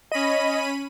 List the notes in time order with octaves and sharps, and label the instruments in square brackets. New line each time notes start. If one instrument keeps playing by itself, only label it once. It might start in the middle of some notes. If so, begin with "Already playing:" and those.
[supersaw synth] C#4 B5 D#7 [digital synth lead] D#5